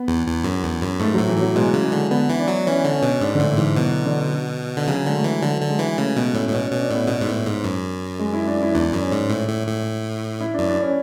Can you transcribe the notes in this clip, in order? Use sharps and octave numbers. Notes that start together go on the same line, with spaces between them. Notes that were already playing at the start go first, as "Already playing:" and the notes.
Already playing: B3
E2
E2
F#2
E2
F#2
G#2 A3
F#3
A2
E3
A2 F#3
B2 G#3
C#3
G#3
D3
D3 B3
E3
D4
F#3
E3 C#4
D3
C#4
B2
G#2 D4
D3
A2 E3
G#2 E3
B2 F#3
D3
D3
C#3 F#3
D3 G#3
A3
E3
D3 F#3
D3
G#3
E3
C#3 A3
B2 B3
A2 C#4
A2
B2 C#4
C#4
B2
D4
A2 B3
B2 B3
G#2
A2
G#2
F#2
G#3
E4
D4
E4
E2 D4
F#2
C#4
G#2
A2
A2
A2
E4
D4
F#2
D4
C#4